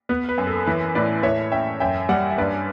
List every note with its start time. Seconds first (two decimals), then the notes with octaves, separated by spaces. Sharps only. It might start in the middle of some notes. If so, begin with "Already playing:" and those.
0.09 B3 B4
0.29 B4
0.38 F#2
0.47 A4
0.67 E3 B4
0.95 A2 B4 D5
1.23 A2 C#5 E5
1.52 C#4 E5 G5
1.80 F#2 E5 G5
2.09 G3 D5 F#5
2.31 E5
2.38 G2 B4 D5